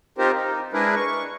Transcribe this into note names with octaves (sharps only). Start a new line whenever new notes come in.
C4 D#4 F4 G4 A#4 C5
D#4
G#3 D4 E4 G#4 A#4 B4
C#6